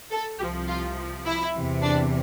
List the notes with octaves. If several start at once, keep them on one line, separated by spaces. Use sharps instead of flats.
A4
C2 C3 F3 G4
F4
E4
E2 C3 E3
D4